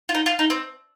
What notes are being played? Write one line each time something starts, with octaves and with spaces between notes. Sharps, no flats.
F4
D#4
F4
D#4
C4